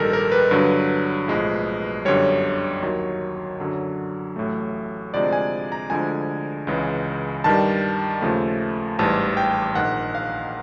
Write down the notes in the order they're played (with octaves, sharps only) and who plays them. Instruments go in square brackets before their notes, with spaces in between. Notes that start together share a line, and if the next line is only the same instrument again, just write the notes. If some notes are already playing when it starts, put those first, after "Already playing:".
Already playing: [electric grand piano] A#1 G#2 D#3 G3 A4 A#4
A#4
B4
G2 D3 F#3
B1 A2 F3 G#3
G1 F#2 D3 G3 C#5
D#2 D#3 F#3
F#2 D3 F#3
A1 A2 F#3 A3
D2 C3 F3 G#3 D5
G#5
A#5
D2 D3 F3 G#3 G#5
C#2 C#3 E3 G#3
G2 D#3 G3 A5
D#2 C#3 F3 A3
A1 G#2 E3 G3 A5
G5
A#1 G#2 D#3 F#5
F5